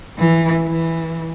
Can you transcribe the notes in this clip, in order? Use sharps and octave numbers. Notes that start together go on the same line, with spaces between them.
E3
E3